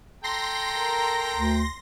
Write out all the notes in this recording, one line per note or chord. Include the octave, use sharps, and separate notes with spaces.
A4 G5 A#5 C6 A#6
A#4
D2